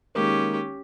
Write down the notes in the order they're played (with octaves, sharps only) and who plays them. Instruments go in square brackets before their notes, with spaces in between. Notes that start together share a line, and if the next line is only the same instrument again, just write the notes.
[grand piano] D#3 G#3 A#3 [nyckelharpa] C#4 G4